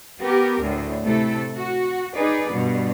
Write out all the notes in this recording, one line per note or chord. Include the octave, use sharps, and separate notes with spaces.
B3 G4 A#4
D2 A2
C3 A3 E4 A4
F#4
D#4 G#4 B4 D5
G2 B2